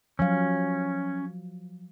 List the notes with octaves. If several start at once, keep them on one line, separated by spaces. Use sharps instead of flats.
F3 F#3 C#4 F5